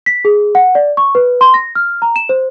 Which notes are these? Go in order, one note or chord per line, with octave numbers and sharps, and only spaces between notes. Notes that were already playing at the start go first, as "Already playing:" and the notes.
B6
G#4
F#5
D5
C#6
B4
C6
A#6
F6
A#5
E7
C5